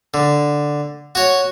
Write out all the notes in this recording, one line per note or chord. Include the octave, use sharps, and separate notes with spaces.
D3
F#4 C#5